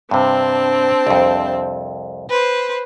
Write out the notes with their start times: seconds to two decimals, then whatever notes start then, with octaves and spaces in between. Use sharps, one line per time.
0.11 G2 C3 C4 D4 A5
1.07 C2 F2
2.29 B4 C5